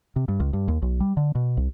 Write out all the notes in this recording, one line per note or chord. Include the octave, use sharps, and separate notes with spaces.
C3
G2
C#2
G2
D#2
B1
G3
D3
B2
C2